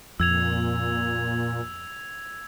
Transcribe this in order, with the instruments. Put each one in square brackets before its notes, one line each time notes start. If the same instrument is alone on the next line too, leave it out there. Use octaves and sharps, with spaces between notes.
[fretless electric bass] F2 [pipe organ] A#2 [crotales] E6 G#6 F7